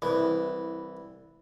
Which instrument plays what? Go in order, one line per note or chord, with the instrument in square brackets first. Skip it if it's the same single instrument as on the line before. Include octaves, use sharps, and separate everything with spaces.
[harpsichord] C2 E3